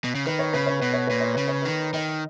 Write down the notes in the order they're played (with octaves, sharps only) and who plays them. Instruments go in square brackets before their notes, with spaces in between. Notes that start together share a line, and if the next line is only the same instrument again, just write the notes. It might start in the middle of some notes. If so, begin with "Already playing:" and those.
[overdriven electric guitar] B2
C#3
[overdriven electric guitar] D#3 [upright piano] B4
[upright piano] C#5
[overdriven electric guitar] C#3 [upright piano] B4
[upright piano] C#5
[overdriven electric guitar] B2 [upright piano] B4
[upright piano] C#5
[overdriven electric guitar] A#2 [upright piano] B4
[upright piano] C#5
[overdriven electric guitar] C#3 [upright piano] B4
[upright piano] C#5
[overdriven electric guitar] D#3 [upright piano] B4
[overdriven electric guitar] D#3 [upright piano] D#5